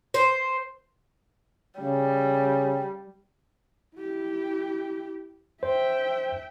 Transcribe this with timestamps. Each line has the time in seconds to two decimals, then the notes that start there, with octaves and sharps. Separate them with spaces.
0.14 C5
1.80 C#3 G3
3.96 E4 G4
5.63 C5 E5 G5